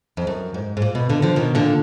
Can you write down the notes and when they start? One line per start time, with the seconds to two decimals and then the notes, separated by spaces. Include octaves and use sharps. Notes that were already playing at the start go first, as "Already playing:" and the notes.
0.17 F2
0.27 F#2
0.54 G#2
0.77 G#2
0.82 A#2
0.95 B2
1.09 A#2 D3
1.22 D3 F3
1.36 B2 D#3
1.55 A#2 D3